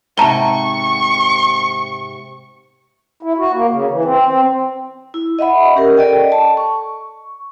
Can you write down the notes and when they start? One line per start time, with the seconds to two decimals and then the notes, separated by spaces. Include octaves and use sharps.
0.18 G#2 C3 A5 A#5 C#6 G7
3.23 E4
3.38 F#4
3.53 A#3
3.71 C#3
3.90 E3
4.04 C4
4.25 C4
5.14 E4
5.39 D#5 E5 F#5 B5
5.75 C#4 G4 A#4
5.97 A4 D5 D#5 G5
6.32 A5
6.57 C#6